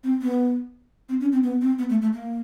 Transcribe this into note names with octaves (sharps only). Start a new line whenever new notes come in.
C4
B3
C4
C#4
C4
B3
C4
B3
A3
A3
A#3